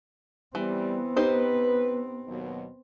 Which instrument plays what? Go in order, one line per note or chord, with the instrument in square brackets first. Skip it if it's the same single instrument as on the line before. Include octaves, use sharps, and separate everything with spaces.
[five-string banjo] E3 [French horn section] G3 [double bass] B3 C4
[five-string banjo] D#4 G4 C5 [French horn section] B4
[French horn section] D#2 B2 F#3